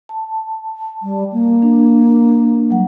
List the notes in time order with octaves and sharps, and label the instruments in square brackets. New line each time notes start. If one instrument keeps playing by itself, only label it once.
[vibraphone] A5
[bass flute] G3
A#3
[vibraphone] D4
F#3 G3 F#5